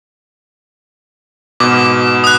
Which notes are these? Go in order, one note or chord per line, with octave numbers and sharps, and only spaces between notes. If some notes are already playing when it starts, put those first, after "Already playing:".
G#2 B2 D6
D#6 F#6